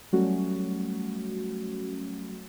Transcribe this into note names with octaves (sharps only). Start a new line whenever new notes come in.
F#3 G3 A3 C#4 F#4